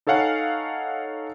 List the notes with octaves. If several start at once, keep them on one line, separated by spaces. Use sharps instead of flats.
D#4 A4 C#5 F5 F#5 G#5